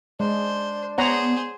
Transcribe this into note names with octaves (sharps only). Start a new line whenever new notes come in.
G#3 D4 C5
B3 G#4 C5 C#5 F#5 A#5